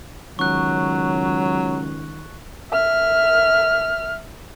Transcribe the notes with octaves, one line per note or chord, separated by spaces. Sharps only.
C#2 D#3 F#3 C#6 F#6
E5 F6